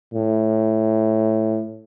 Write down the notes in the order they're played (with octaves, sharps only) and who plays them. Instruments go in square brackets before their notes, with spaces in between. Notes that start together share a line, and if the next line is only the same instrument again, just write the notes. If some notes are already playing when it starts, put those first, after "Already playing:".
[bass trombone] A2